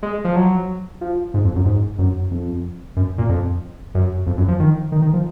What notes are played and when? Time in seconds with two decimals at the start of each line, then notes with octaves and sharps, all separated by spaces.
0.03 G#3
0.25 F3
0.36 F#3
1.01 F3
1.34 G#2
1.45 F2
1.56 F#2
1.66 G#2
1.99 F#2
2.31 F2
2.97 F#2
3.18 A#2
3.29 F2
3.95 F#2
4.27 F2
4.38 F#2
4.48 F3
4.60 D#3
4.92 D#3
5.02 D#3
5.13 F3